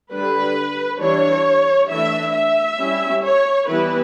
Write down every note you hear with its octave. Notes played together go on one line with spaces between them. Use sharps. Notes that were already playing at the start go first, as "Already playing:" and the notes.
D3 G3 D4 B4
E3 G3 D4 C#5
E3 A3 D4 E5
E5
G3 C#4 E4
C#5
E3 G3 B3 E4 B4